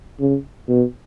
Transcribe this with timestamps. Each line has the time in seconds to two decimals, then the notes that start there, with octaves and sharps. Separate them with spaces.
0.21 C#3
0.69 B2